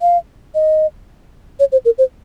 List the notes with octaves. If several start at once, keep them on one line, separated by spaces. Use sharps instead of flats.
F5
D#5
C#5
C5
A#4
C5